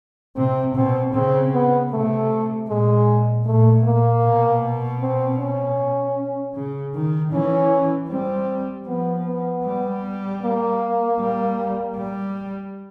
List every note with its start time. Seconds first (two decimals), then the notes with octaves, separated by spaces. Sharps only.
0.36 C3 C4
0.75 B2 C4
1.14 C#3 C4
1.53 B3
1.91 C3 A3
2.68 A#2 G#3
3.45 A#2 A3
3.84 A#3
4.23 B2
5.01 C4
5.39 C#4
6.55 C#3
6.95 D#3
7.33 E3 C#4
8.09 G3 C4
8.87 F3 B3
9.26 B3
9.65 G3
10.43 A#3
11.20 G3
11.96 G3